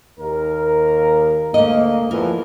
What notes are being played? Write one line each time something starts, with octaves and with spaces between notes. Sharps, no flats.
D#2 A#4
D2 A#3 D#5
E2 E3 F3 A#4